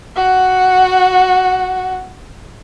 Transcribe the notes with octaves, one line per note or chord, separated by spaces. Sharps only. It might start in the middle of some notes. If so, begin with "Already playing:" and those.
F#4 F#5